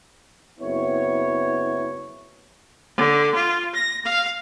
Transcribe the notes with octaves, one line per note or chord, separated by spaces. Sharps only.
F#1 B3 C4 E4 C#5
D3
F4
A#6
F5